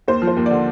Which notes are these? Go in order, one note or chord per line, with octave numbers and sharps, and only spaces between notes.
D#2 C5
F3
C5
D#2
D3 D5